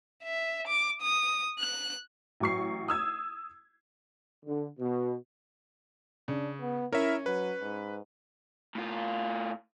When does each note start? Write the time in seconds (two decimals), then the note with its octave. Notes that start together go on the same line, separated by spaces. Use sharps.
0.23 E5
0.67 D6
1.02 D#6
1.59 F#6
2.40 A1 F#3 C#6 C7
2.88 D#6 E6 G#6
4.46 D3
4.79 B2
6.28 C#3 D4
6.61 B3
6.93 C#4 E4 A#4 E5
7.26 F#3 B4
7.61 G#2
8.75 A2 F4